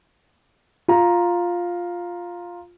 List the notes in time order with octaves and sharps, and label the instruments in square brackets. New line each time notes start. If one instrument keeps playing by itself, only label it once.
[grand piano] F4 A#5